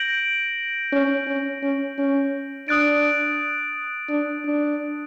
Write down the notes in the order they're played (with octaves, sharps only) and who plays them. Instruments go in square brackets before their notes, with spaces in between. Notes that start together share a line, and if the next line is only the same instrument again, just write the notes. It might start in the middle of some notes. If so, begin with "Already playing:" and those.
Already playing: [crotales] G6 A#6 D7 F#7
[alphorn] C#4
C#4
C#4
C#4
[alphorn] D4 [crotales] D#6 F#6 A6 D7
[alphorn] D4
D4